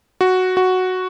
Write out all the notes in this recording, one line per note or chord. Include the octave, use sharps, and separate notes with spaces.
F#4
F#4